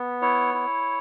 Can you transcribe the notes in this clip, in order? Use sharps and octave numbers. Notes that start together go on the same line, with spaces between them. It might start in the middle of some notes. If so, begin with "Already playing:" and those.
Already playing: B3
E4 C#5
E4